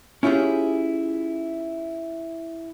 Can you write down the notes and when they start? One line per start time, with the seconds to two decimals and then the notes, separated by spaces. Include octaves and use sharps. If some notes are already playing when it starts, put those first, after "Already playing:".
0.23 C#4 E4 F4 G4 G#4